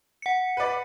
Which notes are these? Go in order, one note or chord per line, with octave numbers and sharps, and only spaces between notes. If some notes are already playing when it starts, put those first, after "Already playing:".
F#5 C#7
B4 D5